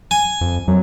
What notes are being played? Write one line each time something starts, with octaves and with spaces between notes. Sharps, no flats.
G#5
F2
F2 F#3